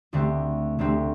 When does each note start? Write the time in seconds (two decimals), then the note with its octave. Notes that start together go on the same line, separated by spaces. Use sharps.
0.13 D2 D3 A3 C4
0.79 D2 D3 A3 C4